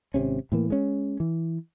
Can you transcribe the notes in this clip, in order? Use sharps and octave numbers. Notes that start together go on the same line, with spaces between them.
G#1 C3 C#4
A2 E3 A#3
G#3 C#4
E3